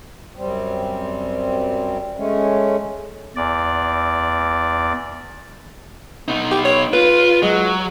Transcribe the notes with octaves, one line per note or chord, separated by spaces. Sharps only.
F#2 G3 C4
G#3 A3 C#4
E2 D5
B2 D#4
G4
C#5
F4 B4
F#3 G#3